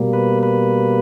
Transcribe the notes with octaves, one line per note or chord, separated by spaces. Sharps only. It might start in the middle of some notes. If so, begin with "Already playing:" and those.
Already playing: B2 G3 A#3
B4
B4